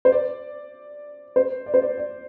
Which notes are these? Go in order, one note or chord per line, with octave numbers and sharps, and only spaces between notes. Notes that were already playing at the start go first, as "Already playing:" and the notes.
C5
D5
C5
D5
C5
D5
D5